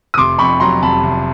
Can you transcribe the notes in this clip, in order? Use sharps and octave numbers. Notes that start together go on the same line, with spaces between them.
D#6
F1 C6 D6
F2 B5 C#6
F#3 A#5 C6
F1 A5 B5
F1